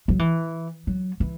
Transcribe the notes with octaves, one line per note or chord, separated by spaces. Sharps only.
F#3
E3
F#3
E3